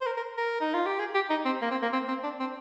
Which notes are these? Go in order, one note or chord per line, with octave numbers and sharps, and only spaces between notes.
C5
A#4
A#4
A#4
D#4
F4
G4
G#4
G4
D#4
C4
A#3
C4
A#3
C4
C4
D4
C4